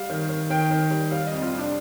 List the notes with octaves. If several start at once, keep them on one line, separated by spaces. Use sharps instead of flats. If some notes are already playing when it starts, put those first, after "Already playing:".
Already playing: G3 F5
D#3
D#3
D#3 G5
D#3
G3
G3 F5
F2 D#5
F4
C3
D4